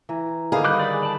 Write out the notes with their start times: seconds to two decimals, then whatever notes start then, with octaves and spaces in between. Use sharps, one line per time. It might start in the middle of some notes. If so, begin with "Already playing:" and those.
0.09 E3 A#5
0.52 D3 D#3 D#4 G#4 B4 F5
0.65 G3 D6 F#6 G6
0.80 D5 B5
1.03 D5 A5